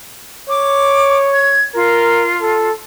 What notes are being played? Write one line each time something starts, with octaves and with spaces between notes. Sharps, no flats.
C#5 D6
G#6
F4 A#4
A4